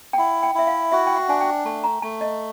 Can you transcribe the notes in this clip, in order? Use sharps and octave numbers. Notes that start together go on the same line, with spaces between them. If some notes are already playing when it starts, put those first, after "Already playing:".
G5
E4 F#5
G5
E4 E5
F5
F#4 E5
G5
F#5
D4 G#5
G5
A3 A5
A#5
A3 A5
D#5